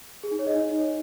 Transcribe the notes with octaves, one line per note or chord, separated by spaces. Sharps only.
G#4
D#4
C#5
D#5
D#4